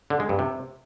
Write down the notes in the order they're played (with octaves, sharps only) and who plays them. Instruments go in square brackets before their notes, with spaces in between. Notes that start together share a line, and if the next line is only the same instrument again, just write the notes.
[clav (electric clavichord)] D3
G#3
G2
C3